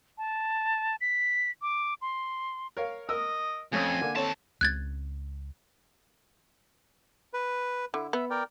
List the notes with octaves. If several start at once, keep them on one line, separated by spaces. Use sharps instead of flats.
A5
B6
D6
C6
A#4 C#5 F5
A#4 D#5 D#6 E6
F2 A3 C#4 G#5 D#6
D3 A#3
D#2 C4 A4 C#5 A5
C#2 C4 F#6 G#6 A6
B4
D3 E4
B3 E5
A#4 D5 G5